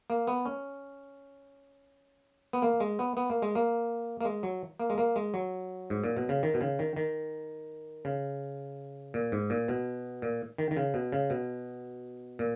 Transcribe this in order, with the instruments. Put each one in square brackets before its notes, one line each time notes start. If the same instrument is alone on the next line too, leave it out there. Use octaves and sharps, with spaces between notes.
[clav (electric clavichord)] A#3
B3
C#4
B3
A#3
G#3
B3
B3
A#3
G#3
A#3
A#3
G#3
F#3
A#3
G#3
A#3
G#3
F#3
G#2
A#2
B2
C#3
D#3
B2
C#3
D#3
D#3
C#3
A#2
G#2
A#2
B2
A#2
D#3
D#3
C#3
B2
C#3
B2
A#2